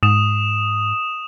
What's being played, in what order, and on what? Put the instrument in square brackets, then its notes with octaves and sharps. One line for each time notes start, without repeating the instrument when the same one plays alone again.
[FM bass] G#2 [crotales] D#6 E7